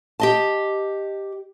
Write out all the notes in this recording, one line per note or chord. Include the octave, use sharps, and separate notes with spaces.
G4 D#5 A5